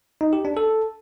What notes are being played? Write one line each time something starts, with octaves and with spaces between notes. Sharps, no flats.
D#4
G4
D4
A4